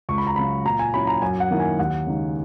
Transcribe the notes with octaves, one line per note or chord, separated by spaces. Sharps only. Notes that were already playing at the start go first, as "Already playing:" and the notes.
C#2 C#6
B5
A#5
C#3 F#3 B5
A#2 A#5
G#5
F#3 C#4 E4 B5
A#5
F#2 G#5
F#5
D#3 A#3 E4
G#5
D#2 F#5
C#3 G#3 D#4